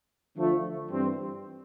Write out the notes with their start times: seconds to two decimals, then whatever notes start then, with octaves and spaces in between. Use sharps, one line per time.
0.35 D3 F3 A3
0.89 G2 E3 G3 C4